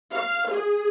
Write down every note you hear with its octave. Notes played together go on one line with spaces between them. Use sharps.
F5
G#4